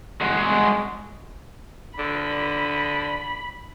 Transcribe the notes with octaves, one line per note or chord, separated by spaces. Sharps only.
G#3 F#4
D3 B5